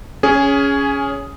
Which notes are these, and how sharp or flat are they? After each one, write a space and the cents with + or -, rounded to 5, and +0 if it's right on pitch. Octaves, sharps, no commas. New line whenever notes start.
C#4 +10 G#4 +0